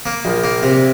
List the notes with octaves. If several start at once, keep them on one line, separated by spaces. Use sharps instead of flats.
A#3
A#1
A#3
C3